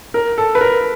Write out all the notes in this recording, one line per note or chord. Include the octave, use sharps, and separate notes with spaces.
A#4
A4
B4
A#4